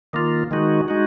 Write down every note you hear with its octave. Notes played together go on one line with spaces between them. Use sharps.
D#3 A#3 F4
D#3 G#3 D#4 F#4
G#3 D#4 F#4